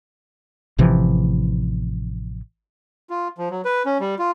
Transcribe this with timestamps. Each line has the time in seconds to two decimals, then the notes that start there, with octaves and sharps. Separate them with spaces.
0.78 A1 C3 E3 F3
3.10 F4
3.38 F3
3.50 F#3
3.65 B4
3.86 C#4
4.00 G3
4.19 F4